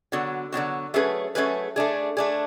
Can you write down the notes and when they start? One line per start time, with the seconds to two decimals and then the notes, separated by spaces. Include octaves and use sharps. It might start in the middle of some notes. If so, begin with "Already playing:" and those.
0.12 D3 F#3 B3 F#4
0.52 D3 F#3 B3 F#4
0.94 F#3 A3 C#4 G#4 B4
1.35 F#3 A3 C#4 G#4 B4
1.76 A3 D4 G#4
2.17 A3 D4 G#4